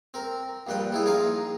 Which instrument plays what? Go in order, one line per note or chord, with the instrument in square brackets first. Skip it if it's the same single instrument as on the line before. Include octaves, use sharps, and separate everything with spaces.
[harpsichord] C4 A#4
A#1 A#2 G3 B4 G5
G3 E4 G#4
A#1 D#4 F4 G#4 A#4 F5